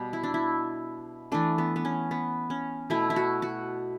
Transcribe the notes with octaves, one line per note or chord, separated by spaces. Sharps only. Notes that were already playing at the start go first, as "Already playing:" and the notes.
Already playing: B2 G3 B3
E4
D4
E4
E3 A3 D4
B3
B3
C#4
B3
C#4
B2 A3 E4
E4
F#4
F#4